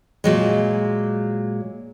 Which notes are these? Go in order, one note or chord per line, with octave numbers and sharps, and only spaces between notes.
A#2 F#3 G#3